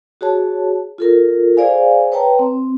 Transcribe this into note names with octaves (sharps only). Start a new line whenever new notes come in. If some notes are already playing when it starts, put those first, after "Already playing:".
F#4 G#4 C#5 A5
F4 A4 A#4
G#4 C5 D5 F5 G#5
B4 C#5 G5 A5 A#5
C4